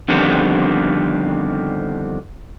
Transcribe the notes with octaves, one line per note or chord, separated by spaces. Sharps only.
F2 D3 D#3 G3 B3 C4